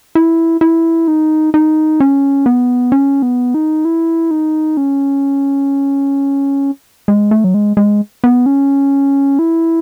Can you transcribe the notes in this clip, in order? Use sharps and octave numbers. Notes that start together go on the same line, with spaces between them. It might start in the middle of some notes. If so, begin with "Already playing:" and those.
E4
E4
D#4
D#4
C#4
B3
C#4
B3
D#4
E4
D#4
C#4
G#3
A3
F#3
G#3
G#3
B3
C#4
E4